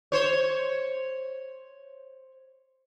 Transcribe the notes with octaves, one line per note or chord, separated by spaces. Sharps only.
C5 C#5